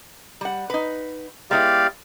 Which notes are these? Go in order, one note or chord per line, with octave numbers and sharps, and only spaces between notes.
G3 F#5
D#4 B4
G#3 B3 E4 G4 D5 F5